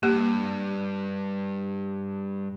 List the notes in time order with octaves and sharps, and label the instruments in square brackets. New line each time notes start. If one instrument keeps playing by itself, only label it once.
[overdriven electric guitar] G2 [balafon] A#3 G4